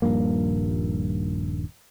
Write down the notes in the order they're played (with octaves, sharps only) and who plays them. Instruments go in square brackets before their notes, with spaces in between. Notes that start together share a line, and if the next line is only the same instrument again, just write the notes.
[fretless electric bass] D#1 G2 F3 A#3